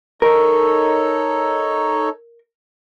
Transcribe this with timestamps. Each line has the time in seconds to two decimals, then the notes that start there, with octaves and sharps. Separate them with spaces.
0.22 D#4 A4 A#4 C#5